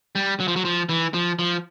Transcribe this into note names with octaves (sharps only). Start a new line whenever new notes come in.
G3
F#3
F3
F#3
F3
E3
F3
F3